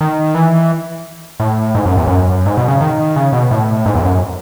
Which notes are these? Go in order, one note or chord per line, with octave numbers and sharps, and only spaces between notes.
D#3
E3
A2
G#2
F#2
E2
F#2
G#2
B2
C#3
D#3
C#3
B2
A2
G#2
E2
F#2